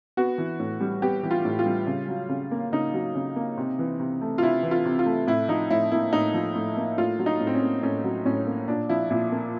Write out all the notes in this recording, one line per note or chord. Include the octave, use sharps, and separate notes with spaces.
B3 F#4
E3
A2
G3
B3 G4
E3
F4
A2
F4
G3
C#3
F#3
C#3
A#3
C#3 D#4
F#3
C#3
A#3
C3
E3
C3
A3
F4
C3 E4
E3
F4
C3
F4
A3
A2 E4
F3 D#4
A2 E4
A#3 E4
A2 D#4
F3
A2
A#3
A2 F4
F#3
D#4
A2
C4
C#4
A#3
A2 C#4
F#3
A2 C#4
A#3
A#2 D4
F3 E4
A#2 E4
A#3